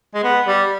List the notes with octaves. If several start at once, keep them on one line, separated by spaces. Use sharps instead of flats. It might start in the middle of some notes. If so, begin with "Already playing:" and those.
G#3
B3
G3